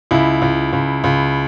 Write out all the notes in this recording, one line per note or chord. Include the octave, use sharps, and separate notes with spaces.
C#2 E4
C#2
C#2
C#2